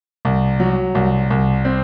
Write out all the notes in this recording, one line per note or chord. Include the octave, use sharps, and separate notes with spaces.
C2
F#3
C2
C2
C4